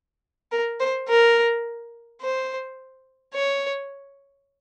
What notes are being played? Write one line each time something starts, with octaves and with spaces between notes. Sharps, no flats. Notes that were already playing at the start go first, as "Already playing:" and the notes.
A#4
C5
A#4
C5
C#5